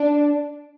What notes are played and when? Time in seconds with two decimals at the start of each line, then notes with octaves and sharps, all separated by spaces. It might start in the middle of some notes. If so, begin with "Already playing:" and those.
Already playing: D4